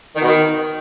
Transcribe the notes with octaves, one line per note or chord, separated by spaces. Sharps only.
D#3
B2
D#3